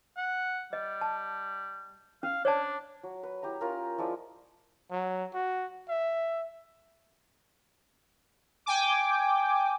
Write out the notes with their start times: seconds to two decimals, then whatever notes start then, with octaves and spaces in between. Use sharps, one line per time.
0.17 F#5
0.73 G3 D#5
1.01 A5
2.23 C#4 F5
2.45 D4 C#5 D5 A5
3.03 F#3
3.23 B4
3.42 E4 G4 E5 A#5
3.61 C#4 F4 A#4
3.98 F3 G#3 E4 D5
4.91 F#3
5.34 F#4
5.89 E5
8.66 G5 G#5 D6